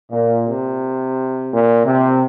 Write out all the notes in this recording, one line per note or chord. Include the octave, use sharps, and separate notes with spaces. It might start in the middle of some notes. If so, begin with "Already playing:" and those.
A#2
C3
A#2
C3